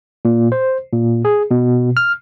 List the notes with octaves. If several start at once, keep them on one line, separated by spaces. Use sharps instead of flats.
A#2
C5
A#2
G#4
B2
F6